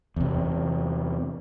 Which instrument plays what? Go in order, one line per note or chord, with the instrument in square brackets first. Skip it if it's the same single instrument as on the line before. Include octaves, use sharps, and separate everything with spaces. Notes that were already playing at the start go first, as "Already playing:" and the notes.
[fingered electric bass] E2 C3